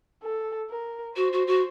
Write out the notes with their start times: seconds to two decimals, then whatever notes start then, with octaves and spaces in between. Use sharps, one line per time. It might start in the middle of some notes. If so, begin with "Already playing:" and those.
0.22 A4
0.70 A#4
1.16 F#4 C5
1.33 F#4
1.47 F#4